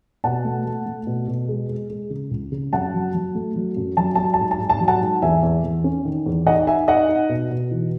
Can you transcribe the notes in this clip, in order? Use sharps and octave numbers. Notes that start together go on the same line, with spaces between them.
B2 F#5 A5
A3
A3
A3
B2
B2
G#3
G#3
G#3
C#3
C#2
C#3
F#2 F#5 A5
F#3
F#3
A3
F#3
F#2
F#3 A5
F#3 A5
A5
G#2
A5
G#2
A5
F#3
F#5 A5
G#2
E2 E5 G#5
E2
E2
C#4
D#3
E2
D#4 D#5 F#5
D#4 E5 G#5
D#4 D#5 F#5
D#4
B2
B2
E3